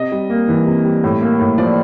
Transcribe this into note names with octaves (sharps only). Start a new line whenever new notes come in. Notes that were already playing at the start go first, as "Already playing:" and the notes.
Already playing: C3 D#5
G3
A#3
E3
C3
G3
A2
A#3
A2
F3 D5